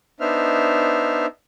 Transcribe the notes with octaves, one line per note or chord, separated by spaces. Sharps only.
B3 D4 D#4 C5 E5 F6